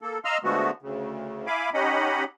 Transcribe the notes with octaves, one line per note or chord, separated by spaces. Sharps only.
A#3 A4
D#5 F5 A#5 C6 E6 F6
D3 F3 G#3 A3 B3 F#4
D2 C#3
E4 F5 G#5 B5 D6
C#4 D#4 G4 D#5 F#5 B5